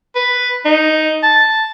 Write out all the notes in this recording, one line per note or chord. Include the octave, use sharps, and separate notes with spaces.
B4
D#4
A5